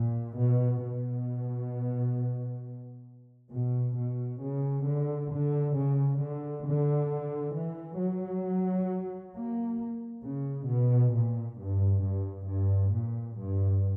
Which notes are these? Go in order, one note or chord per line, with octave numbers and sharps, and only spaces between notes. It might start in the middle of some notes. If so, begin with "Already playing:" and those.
Already playing: A#2
B2
B2
B2
B2
C#3
D3
D3
C#3
D3
D3
E3
F#3
A#3
C#3
B2
A#2
G2
G2
G2
A#2
G2